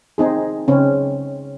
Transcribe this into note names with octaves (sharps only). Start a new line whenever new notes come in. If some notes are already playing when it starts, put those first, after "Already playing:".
C4 D#4 G#4
C#3 C4 C#4